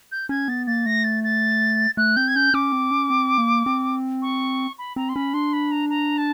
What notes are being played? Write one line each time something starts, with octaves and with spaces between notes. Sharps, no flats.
G6
C#4 G#6
B3 A6
A#3 A6
A3 A#6
A6
A6
A3 F#6
C4 G6
G#6
C#4 G6
C#4 D6
C4
C#4
C4
A#3
C4
C#6
B5
C4 A#5
C6
C#4 B5
D4 C6
B5
A#5
A#5
A5